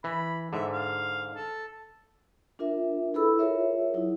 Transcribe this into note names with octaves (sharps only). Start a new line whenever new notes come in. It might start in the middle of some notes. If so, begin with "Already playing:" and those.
E3 B5
G#2 D3 E5
F5
A4
D4 F4 A#4 E5
E4 G#4 A4 B4 B5 E6
F4 G#4 A#4 C#5 E5
F#3 D#4 E4